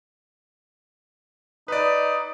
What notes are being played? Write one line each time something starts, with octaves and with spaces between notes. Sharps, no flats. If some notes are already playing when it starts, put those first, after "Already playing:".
D#4 B4 D5